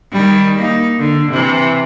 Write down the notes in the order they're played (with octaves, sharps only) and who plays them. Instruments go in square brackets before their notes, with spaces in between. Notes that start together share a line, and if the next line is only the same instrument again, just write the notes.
[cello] D#3 G3
A#3 D#4
D3
C3 E3